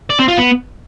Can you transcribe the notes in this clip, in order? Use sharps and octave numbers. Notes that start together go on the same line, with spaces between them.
D5
C4
F4
B3